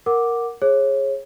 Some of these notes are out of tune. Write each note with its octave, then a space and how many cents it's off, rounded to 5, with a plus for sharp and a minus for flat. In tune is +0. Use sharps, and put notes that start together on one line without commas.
A#4 +0 F#5 +0 D6 +0
G#4 +0 C#5 -30